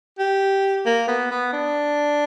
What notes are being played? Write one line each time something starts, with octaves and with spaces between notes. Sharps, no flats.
G4
A#3
B3
B3
D4